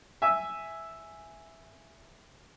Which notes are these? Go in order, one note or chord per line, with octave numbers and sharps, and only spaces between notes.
E5 G#5 E6